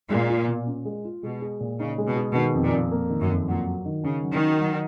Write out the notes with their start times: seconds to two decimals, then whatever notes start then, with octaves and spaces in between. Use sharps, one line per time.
0.10 A#2 G#3
0.29 F4
0.48 B2
0.67 C#4
0.85 G#3
1.05 F4
1.23 B2 G#3
1.42 G#4
1.60 A#2
1.79 C#3 D#4
1.98 G#3
2.07 B2
2.16 G#4
2.35 B2 D#3
2.54 F2
2.63 A#2
2.73 F2
2.91 A#3
3.10 D#3
3.20 F#2
3.29 F2
3.48 A#2 F#3
3.66 F#4
3.86 D#3
4.04 C#3 C#4
4.23 F#3
4.32 D#3
4.42 F#4
4.60 F#3